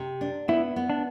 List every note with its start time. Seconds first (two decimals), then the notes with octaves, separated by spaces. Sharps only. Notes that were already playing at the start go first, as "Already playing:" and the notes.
Already playing: C3
0.21 D4
0.48 B3 E4
0.76 B3
0.90 D4